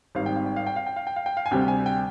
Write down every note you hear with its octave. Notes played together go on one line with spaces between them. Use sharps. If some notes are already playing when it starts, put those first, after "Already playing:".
G#1 G#2 G3 C4 F5
G5
F5
G5
F5
G5
F5
G5
F5
G5
F5
G5
F5
G#5
D2 C3 G3 C4 G5
G5
G#5
G5